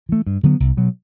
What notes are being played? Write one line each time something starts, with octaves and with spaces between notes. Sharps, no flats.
E3 A3
G2
D3 F#3 B3
C2
B2 F#3